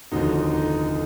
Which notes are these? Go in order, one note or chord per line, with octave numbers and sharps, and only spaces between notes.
F1 D#2 D3 F3 D#4 F#4
D#4